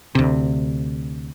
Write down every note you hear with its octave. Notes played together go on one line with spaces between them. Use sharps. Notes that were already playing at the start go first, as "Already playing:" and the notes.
D2 C3